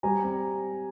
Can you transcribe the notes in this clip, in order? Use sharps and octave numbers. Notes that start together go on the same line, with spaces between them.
G3 G#5 A#5
C4